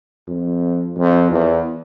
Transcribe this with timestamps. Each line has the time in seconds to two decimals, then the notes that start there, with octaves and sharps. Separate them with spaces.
0.27 F2
0.97 F2
1.31 E2